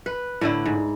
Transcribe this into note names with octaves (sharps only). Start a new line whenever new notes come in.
B4
A2 D3 E4
G#2